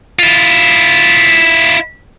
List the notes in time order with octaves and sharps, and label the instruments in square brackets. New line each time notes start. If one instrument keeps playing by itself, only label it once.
[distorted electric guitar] E4 F4